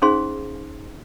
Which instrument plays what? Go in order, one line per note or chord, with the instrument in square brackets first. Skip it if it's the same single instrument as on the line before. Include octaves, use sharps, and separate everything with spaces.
[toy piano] C#4 D#4 G#4 C5 F5 C6